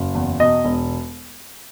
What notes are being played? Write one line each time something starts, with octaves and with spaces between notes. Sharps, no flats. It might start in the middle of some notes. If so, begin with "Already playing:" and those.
Already playing: F#1
E2
B2 D#5
E1